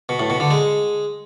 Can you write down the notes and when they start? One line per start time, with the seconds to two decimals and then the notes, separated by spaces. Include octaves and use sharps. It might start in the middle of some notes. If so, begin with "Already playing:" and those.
0.09 B2
0.20 A2
0.30 B2
0.40 D3
0.51 G#3